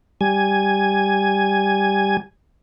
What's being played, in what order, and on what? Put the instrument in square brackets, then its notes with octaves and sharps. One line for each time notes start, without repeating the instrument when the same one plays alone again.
[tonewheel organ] G3 G#5